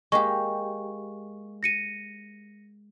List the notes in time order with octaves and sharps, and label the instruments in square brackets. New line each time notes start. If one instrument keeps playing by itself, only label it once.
[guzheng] G#3 A#3 G4 [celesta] C#6
[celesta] A#6 C#7 D#7